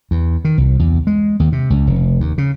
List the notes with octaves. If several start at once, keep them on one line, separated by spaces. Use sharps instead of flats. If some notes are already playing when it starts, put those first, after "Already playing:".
E2
D#3
C2
E2
G#3
D#2
C3
C#2
F1
D#2
C#3